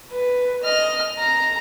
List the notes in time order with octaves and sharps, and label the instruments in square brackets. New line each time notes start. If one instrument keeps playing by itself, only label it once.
[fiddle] B4
D#5 F6
A#5